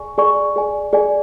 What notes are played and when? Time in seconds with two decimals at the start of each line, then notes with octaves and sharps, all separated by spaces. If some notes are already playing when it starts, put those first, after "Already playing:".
Already playing: G#4 D5 G#5 C#6
0.18 G#4 D5 G#5 C#6
0.56 G#4 D5 G#5
0.93 G#4 D5 G#5